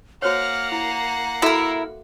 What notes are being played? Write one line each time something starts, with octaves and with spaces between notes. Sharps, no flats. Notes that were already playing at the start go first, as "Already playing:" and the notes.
A#3 F#4 C5 C#5 F#5 F6
E4 A#5
E4 F#4 A4 A#4 E5